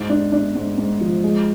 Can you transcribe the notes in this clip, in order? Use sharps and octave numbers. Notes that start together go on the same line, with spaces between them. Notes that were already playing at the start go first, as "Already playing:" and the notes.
Already playing: G#2
D4
D4
G#2
G#2
F3
G#3